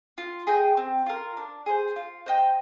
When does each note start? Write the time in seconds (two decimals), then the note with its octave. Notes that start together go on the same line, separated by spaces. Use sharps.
0.18 F4
0.47 G#4 D#5 G5
0.77 C4
1.06 F4 A#4
1.37 D4
1.66 G#4 C5
1.96 F4
2.26 C5 D#5 G5